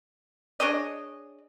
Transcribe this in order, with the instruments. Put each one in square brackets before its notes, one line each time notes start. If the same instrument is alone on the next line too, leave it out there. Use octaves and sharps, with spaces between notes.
[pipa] D4 G#4 C#5 D#5